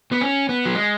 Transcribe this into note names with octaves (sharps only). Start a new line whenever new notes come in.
B3
C#4
B3
F#3
G#3